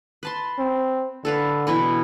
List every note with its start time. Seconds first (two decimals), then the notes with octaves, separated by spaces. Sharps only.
0.23 B4 A5 C6
0.59 C4
1.25 D3 A4 B4 F5
1.67 B2 E3 B4